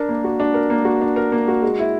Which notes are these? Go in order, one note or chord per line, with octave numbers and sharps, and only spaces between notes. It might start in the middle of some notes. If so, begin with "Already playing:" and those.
Already playing: D4 A#4
A#3
F#4
D4
A#4
A#3
F#4
D4
A#4
A#3
F#4
G#3
E4